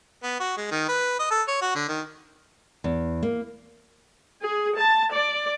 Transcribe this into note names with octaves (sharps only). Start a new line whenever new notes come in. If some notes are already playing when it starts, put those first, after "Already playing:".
B3
F#4
G#3
D#3
B4
D#5
A4
C#5
F#4
D3
D#3
E2
A#3
G#4
A5
D5